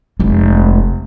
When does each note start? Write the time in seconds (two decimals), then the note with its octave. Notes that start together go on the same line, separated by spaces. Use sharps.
0.20 F1 G#3